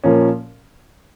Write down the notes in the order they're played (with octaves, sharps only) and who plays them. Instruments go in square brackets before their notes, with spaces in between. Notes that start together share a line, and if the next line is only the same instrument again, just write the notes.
[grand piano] A#2 F3 A#3 C#4